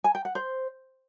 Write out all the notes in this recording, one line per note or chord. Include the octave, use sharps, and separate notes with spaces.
G#5
G5
F#5
C5